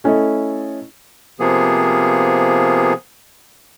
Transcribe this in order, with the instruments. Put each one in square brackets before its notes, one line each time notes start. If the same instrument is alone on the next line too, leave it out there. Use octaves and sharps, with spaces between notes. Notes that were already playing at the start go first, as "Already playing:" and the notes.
[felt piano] A3 C#4 E4 A4 D#5
[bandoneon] C3 F3 A#3 B3 G#4